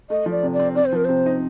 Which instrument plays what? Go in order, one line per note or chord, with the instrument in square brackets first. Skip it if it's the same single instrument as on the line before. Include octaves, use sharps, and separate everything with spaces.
[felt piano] A3 [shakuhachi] D#5
[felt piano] F3
[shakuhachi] D5
[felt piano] C3
[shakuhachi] D5
[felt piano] C4
[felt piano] C4 [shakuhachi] D5
[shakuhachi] C5
[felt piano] F3 [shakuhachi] A#4
[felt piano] C3 [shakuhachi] C5
[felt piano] D#4